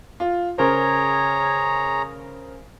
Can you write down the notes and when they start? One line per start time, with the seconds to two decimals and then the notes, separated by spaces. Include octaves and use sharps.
0.20 F4
0.58 C#3 G#4 A#4 C5 C#5 A#5